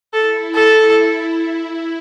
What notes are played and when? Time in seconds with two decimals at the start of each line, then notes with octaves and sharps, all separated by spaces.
0.13 E4 A4
0.55 A4
0.96 E4